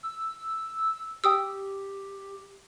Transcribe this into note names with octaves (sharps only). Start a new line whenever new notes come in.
E6
G4 G5 D#6 E6